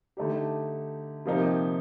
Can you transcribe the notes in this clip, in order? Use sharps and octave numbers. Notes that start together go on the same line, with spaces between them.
D3 A3 D#4 G4
C3 F3 A#3 D#4 G4